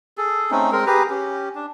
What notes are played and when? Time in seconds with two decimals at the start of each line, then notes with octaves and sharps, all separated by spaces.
0.18 G#4 A4
0.51 A3 C4 C#4 D#4
0.72 G#3 C4 A#4
0.87 G4 G#4 B4 A#5
1.10 C#4 G4
1.55 D4